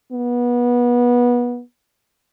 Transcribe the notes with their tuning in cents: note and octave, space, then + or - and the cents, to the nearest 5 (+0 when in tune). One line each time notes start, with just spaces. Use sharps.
B3 -25